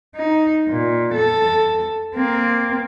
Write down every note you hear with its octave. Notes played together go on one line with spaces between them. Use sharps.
D#4
A#2
A4
A#3 C4